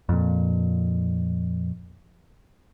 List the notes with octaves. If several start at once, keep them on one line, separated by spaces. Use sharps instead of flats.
F2 A#2